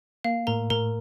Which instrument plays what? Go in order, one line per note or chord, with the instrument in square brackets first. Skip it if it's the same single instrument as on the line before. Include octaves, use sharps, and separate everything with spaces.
[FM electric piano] A#3 [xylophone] F5
[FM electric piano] A2 [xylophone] A#4 A#5
[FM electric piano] A2 [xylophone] A#4 A#5